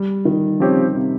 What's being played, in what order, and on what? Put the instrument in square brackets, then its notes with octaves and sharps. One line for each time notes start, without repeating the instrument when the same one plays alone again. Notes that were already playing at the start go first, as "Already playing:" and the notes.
Already playing: [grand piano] G3
D#3
[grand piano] C#3 [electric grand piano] F3 C4 G4 C#5
[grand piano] C3